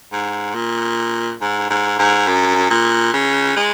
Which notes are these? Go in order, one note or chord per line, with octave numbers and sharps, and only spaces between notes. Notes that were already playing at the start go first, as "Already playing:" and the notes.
G#2
A#2
G#2
G#2
G#2
F#2
A#2
C#3
G#3